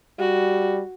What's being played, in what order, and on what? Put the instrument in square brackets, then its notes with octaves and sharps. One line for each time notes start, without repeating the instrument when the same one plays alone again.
[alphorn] G3 [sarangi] F#4